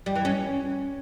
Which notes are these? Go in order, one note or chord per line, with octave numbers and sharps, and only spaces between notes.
G3
E3
C#4